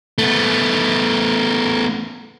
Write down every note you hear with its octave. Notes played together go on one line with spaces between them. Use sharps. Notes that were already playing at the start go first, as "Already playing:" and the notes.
A3 B3